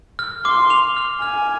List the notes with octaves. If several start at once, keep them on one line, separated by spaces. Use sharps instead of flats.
F6
C6 D6
F7
F6
G#5 F6